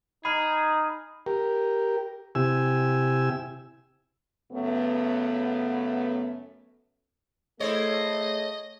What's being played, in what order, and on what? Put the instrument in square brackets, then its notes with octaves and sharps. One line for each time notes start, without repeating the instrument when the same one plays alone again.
[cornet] D#4 [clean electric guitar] G#4 [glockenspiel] B5 F6
[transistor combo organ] G4 A#4
C3 E4 G4 G#5 E6
[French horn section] F#2 C#3 A3 B3
[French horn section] A3 G#4 [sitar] E4 C5 C#5 [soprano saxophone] D#5